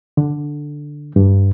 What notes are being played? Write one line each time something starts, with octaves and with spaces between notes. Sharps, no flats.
D3
G2